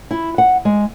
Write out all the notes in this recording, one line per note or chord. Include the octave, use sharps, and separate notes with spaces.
E4
F#5
G#3